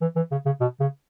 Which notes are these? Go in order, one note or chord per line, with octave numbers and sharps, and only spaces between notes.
E3
E3
C#3
C#3
B2
C#3